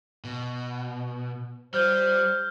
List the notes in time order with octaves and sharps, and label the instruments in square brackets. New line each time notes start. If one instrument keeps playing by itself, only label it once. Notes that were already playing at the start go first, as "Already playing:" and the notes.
[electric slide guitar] B2
[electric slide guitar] G3 [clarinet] C5 [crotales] F6 G6 G7